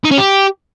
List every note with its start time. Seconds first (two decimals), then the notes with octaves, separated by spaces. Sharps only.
0.05 D#4
0.11 C#4
0.18 G4